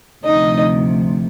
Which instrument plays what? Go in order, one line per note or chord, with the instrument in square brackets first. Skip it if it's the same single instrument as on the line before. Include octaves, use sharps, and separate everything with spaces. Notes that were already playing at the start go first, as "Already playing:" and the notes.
[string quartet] D2 C3 F3 D#4 D#5